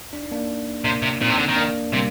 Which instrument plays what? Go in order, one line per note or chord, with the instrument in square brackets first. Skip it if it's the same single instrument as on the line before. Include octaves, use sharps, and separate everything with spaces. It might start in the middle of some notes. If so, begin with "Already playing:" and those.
[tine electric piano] D4
D#4
A#3 D4
[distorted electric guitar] C3 [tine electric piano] A#3 D4
[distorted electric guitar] C3
[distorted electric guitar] A#2 [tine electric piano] C4 D#4
[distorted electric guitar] C3
D3
D#3
[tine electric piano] A#3 D4
[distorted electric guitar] C3 [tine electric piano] G3 A#3